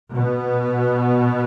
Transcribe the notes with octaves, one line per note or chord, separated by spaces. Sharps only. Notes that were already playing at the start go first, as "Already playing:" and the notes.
B2 B3